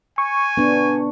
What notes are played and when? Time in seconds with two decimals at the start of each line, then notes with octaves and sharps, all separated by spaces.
0.18 G#5 C#6
0.57 B3 D4